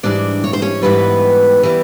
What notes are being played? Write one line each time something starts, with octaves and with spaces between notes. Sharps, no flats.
G#2 E3 G3 D4 D5
C#5
C5
C#4 C#5
G#2 E3 G3 B3 B4
E3 G3